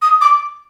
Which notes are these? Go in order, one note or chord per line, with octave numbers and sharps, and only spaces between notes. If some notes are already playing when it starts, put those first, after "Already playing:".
D#6
D6